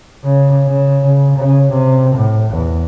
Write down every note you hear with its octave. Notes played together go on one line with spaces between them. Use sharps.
C#3
C#3
C#3
C#3
C3
A2
E2